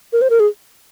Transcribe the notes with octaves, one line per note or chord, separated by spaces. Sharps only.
A#4
C5
A#4
G#4